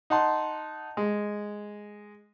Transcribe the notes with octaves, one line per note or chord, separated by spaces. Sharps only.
D#4 F#5 A5 C6
G#3